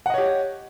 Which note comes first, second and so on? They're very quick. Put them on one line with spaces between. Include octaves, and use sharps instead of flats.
F#5 D#5 C#5 G4